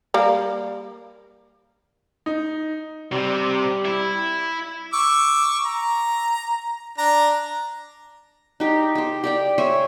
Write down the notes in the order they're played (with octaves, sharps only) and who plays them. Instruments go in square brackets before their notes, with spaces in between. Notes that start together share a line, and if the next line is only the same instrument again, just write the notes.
[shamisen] G3 A#3
[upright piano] D#4
[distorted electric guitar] C3 [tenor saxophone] G3
[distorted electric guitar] E4
[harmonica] C#6 D6 E6
A#5
D4 A#5
[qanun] D#4 G4
G4 C5
G4 D5 G5
C5 C#5 E5 G#5